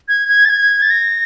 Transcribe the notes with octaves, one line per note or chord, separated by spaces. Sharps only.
G#6
G#6
A6
G#6
A6
A#6